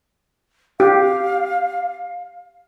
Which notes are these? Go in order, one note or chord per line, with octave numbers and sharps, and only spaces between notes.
G4 F5